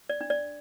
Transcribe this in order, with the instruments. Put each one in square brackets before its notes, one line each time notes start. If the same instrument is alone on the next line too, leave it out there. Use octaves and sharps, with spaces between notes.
[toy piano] D5
D4
D5